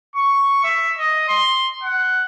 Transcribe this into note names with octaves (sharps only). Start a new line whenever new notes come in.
C#6
E5
D#5
C6
F#5